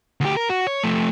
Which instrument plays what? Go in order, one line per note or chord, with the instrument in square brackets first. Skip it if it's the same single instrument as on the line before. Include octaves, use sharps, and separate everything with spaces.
[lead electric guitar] D2 G4
A#4
F#4
C#5
F3 A3